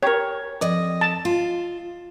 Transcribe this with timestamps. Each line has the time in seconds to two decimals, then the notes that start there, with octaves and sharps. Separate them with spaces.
0.03 G4 A#4 C#5
0.61 F2 D5 D#5
1.01 A5
1.25 F4